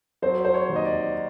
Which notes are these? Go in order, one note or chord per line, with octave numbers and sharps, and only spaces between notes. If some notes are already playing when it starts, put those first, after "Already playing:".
F#3 C5
C5
C#5
D#2
D#5
D5